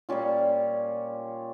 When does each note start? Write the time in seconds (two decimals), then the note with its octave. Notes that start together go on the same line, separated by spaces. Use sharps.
0.09 A#2 G3 C#4 F4